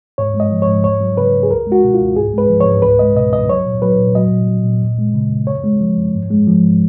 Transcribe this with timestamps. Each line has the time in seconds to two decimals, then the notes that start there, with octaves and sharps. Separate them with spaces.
0.18 G#2 C#5
0.34 G#3
0.40 D#5
0.52 F3
0.62 G#2 C#5
0.84 F2 C#5
1.01 F#3
1.17 C#3 B4
1.34 F2
1.43 G#4
1.50 C#2 A#4
1.66 G#3
1.72 F#4
1.84 B2
1.94 F4
2.00 C#2
2.16 G#2 G#4
2.34 G#3 B4
2.49 F3
2.60 C#5
2.66 G#2
2.82 C#2 B4
2.99 G#3 D#5
3.15 B2 D#5
3.33 C#2 D#5
3.48 F#3 C#5
3.66 A#2
3.82 F#3 B4
3.98 A#2
4.15 F#3 D#5
4.32 A#2
4.48 F#3
4.65 A#2
4.82 F2
4.98 G#3
5.14 C#3
5.31 F2
5.47 F#2 C#5
5.64 G#3
5.80 F3
5.97 F#2
6.14 G#2
6.30 G#3
6.47 F3
6.63 G#2